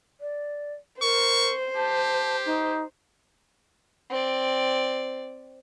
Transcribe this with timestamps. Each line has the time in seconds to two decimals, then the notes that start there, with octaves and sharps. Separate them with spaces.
0.21 D5
1.02 A#4 C5 C#6
1.75 G4 A5
2.46 D#4
4.10 C4 D5